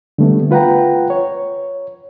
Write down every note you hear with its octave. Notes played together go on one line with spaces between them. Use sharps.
D3 G3 A3 B3
F4 B4 F#5 G5 A#5
C#5